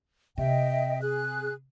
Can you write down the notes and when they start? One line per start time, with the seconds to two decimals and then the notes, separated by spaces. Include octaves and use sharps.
0.38 C3 D#5 E5 G5
1.02 G#4 F#6